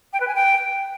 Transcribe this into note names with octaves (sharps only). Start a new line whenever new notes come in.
G5
B4
G#5
G5